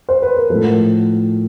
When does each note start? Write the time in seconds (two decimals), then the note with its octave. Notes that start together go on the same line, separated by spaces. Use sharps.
0.09 C5
0.22 B4
0.36 A#4
0.50 A2 F3 A4